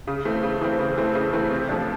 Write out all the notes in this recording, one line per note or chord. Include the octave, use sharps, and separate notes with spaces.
C#3
E3 A3 C4
C#3
E3 A3 C4
C#3
E3 A3 C4
C#3
E3 A3 C4
C3
F3 A3 D4